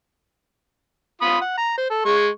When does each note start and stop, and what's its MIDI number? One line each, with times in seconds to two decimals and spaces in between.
1.22 1.38 65
1.22 1.38 83
1.22 1.38 87
1.41 1.55 78
1.57 1.77 82
1.78 1.90 72
1.90 2.02 69
2.05 2.28 56
2.05 2.28 85